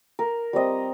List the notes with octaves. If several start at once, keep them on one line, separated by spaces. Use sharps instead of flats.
A#4
G3 C4 D#5